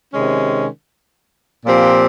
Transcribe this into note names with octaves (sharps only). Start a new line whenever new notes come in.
C3 D#3 G#3 C#4
A#2 F3 C4 G4